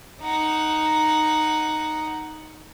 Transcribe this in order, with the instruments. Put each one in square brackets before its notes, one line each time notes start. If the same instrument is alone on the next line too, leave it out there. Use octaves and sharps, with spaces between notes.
[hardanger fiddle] D#4 F#5